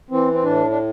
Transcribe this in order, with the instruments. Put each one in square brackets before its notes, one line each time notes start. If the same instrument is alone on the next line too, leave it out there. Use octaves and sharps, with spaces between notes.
[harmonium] E3 C4
C4
A2 D4
D4